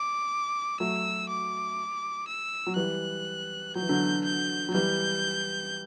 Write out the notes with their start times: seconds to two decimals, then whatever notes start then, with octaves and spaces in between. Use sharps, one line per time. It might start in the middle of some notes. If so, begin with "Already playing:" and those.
Already playing: D6
0.80 F#3 A3 E6
1.29 D6
2.28 E6
2.67 F#3
2.76 E3 G3 F#6
3.75 F#3 G6
3.82 E3
3.89 D3 F#3
4.24 G6
4.69 F#3
4.74 E3 G3 G6